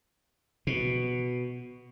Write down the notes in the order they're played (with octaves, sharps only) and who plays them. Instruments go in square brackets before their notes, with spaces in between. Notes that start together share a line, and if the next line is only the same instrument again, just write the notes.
[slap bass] B2